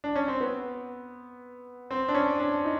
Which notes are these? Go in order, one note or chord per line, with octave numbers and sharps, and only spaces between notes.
D4
C#4
C4
B3
C4
D4
C#4
D4
D#4